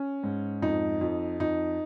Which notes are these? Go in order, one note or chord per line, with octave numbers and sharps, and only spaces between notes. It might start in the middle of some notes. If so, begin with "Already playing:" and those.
Already playing: C#4
G#2
F2 D#4
F2
F2 D#4